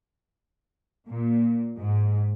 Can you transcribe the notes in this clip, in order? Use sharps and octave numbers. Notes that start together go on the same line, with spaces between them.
A#2
G#2